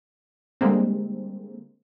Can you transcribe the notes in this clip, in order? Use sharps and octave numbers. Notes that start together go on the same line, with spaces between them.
D3 G3 G#3 A#3 C4